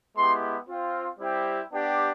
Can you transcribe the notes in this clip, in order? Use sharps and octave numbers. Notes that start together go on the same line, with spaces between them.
G#3 B3 E4 G4 C6
C4 F4
G3 C4 E4 G4
B3 D4 G4